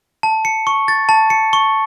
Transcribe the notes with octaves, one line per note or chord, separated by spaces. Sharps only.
A5
C#7
C#6
A6
A5
C#7
C#6